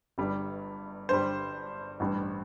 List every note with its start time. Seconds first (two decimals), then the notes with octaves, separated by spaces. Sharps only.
0.18 G1 G2 G3
1.09 G1 G2 G3 C5
2.00 A1 G2 G3